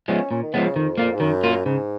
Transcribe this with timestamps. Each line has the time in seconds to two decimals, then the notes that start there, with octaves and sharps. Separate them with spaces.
0.08 F3 G#3 B3 C#4
0.31 A#2 C#4
0.43 D#3
0.53 C#3 F3 G#3 B3
0.65 C#3
0.76 F2 D#3
0.98 A#3 F4
1.14 G#2
1.20 F#2 D#3
1.43 A#3 F4
1.65 G#2 C#3